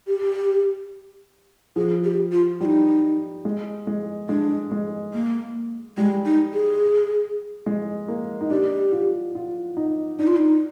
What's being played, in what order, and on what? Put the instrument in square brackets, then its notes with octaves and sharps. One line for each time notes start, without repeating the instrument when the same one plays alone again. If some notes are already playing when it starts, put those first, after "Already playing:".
[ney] G4
[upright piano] F3 [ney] G#4
[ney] G4
F4
[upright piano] G3 [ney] F4
[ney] D#4
[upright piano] G#3
G#3
[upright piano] G#3 [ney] D4
[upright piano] G#3
[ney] A#3
[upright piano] G3 [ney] G#3
[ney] D#4
G#4
[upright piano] G#3
A#3
D#4
[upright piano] D4 [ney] G4
[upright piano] F4
F4
D#4
[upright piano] D4 [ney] D#4
[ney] F4
D#4